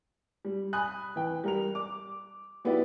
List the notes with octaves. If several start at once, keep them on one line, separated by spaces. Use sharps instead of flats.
G3
G#5 B5 D#6 F#6
E3 G5
G3 A#4 F7
D6
F#3 B3 E4 G4 D5